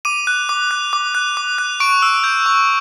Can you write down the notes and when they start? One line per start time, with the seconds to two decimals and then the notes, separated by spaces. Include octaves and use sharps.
0.05 D6 D#7
0.27 F#6
0.49 D6
0.71 F#6
0.93 D6
1.15 F#6
1.37 D6
1.58 F#6
1.80 C#6 D7
2.02 E6
2.24 G6
2.46 C#6